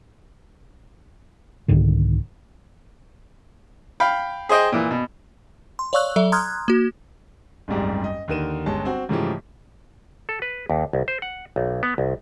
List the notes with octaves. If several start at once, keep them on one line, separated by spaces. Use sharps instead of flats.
C2 G#2 D3 D#3
F5 G5 B5
G#4 C5 D#5 G5
A#2 E3
B2
C6
C#5 D5 F5 C#6 E6 F#6
F#3 A4 D5 E5
A#5 C6 D#6 F6 F#6 G#6
A#3 F#4
F#1 C2 G#2 G3
D#5
D#2 D3 D#4 A#4 D#7 E7
G1 G#3 C#4 A5
C4 F#4
G#2 C#3 E3 F3 A3 G4
A4
B4
D#2
C2
C5
F#5
B1
B3
C2